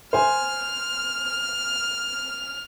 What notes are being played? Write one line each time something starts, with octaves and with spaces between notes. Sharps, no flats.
C5 G#5 F6